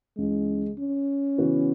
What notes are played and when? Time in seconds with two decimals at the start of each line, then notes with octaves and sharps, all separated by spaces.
0.18 C#2 C#3 E3 G#3
0.78 C#4
1.38 C#3 E3 B3 F#4 B4